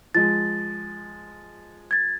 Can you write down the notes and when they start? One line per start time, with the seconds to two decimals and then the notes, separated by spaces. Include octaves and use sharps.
0.15 F3 G#3 A6
1.91 G#6 A6